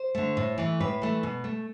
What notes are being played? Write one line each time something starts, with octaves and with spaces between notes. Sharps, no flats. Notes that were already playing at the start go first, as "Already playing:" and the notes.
Already playing: C5
D3 A3
A2
E3 A3
A2 B4
E3 A3
B2
A3